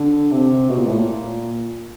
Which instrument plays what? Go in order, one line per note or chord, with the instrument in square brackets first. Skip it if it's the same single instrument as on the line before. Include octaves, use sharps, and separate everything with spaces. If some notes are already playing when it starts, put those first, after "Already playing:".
Already playing: [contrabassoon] D3
C3
B2
A#2
A2
A#2